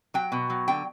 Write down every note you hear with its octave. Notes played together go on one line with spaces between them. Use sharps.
F#3 G5
B2
F#3
D3 G5